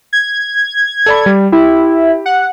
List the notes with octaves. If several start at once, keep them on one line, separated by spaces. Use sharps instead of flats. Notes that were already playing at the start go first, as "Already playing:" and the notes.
G#6
A4 D5 B5
G3
E4 G4
F#5